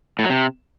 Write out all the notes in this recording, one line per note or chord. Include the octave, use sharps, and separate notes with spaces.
A2
F#3
C3